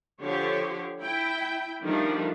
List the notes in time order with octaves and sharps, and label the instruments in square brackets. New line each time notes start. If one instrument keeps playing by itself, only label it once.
[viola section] D3 F3 G4 C5 C#5
E4 G5
D#3 F3 G3 A3 D4 D#4